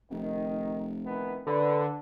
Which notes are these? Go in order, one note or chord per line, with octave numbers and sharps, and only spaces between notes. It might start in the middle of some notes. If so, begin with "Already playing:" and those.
F1 D#3
D#3 E3 B3
F#2 D3 B4